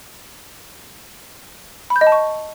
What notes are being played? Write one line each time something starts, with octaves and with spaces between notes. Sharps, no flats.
B5
G6
D#5
A5
C#6